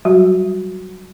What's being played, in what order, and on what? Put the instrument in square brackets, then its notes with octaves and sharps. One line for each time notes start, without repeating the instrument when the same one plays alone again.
[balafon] F#3 G3 F#4